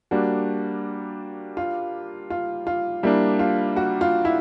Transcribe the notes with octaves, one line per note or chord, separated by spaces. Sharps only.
G3 A#3 D4 F#4
F4
F4
F4
G3 A#3 D4 E4
F4
F#4
F4
E4